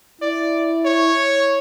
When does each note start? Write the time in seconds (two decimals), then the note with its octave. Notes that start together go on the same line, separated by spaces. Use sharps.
0.21 E4 D5
0.85 C#5